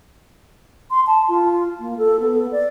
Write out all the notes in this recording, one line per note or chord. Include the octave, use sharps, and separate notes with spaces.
C6
A5
F4
A#3
A4
B3
D5